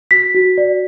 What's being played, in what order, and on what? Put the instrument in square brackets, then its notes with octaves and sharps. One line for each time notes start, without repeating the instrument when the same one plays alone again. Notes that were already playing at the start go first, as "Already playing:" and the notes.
[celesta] F#4 B6
F#4
D5